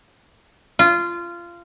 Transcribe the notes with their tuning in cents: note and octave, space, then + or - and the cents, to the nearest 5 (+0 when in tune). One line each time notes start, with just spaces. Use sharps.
F4 -20